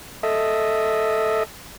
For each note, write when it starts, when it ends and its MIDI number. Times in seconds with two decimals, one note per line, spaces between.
0.23 1.43 69
0.23 1.43 75
0.23 1.43 76